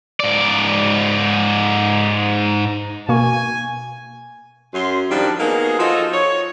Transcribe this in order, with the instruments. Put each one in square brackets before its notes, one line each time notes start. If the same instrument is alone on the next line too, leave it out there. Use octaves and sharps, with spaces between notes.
[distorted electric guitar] G#2 D5
[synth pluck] B2 A#3 C#6 [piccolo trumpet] G#5
[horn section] F#2 C6
D#3 F3 G3 D4
A#3 B3 D#4 F#4 G#4
F3 D#4 F4 F#4 A4 D#5
C#5